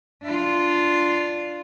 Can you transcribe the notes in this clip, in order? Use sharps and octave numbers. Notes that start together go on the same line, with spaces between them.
D4 F4